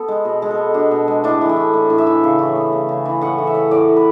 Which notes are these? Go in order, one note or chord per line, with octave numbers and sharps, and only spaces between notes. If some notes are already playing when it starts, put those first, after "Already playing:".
Already playing: B3 A4
G#3
B2
G#3
A4
B3
B2 D4
B2
G#3
A2 D4
E3
E4
A3
A2
A2
E5
E3
C#3
E3
B3
C#3
C#3
E3
A2 F#5
E3
E5
A3
A2 D5
A2
B4